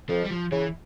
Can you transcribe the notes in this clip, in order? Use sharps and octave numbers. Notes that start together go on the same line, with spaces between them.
F2 F3
G3
F3
C#3 E3